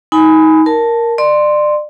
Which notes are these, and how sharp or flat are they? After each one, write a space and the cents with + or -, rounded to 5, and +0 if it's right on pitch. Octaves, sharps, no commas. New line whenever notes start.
D#4 +25 G#5 +0 B5 +15
A#4 +0 A5 +0
D5 +30 C6 +0